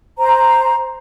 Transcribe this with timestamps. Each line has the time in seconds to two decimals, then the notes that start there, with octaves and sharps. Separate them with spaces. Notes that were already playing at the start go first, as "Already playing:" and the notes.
0.19 C5 A#5